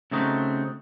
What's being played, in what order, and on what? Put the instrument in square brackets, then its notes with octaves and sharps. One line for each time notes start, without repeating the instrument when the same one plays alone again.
[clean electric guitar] C#3 A3 C4 D#4 F#4